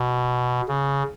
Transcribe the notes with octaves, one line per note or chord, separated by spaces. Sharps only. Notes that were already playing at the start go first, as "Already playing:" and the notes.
Already playing: B2
C#3